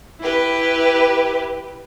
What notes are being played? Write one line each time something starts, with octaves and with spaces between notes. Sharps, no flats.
E4 G4 B4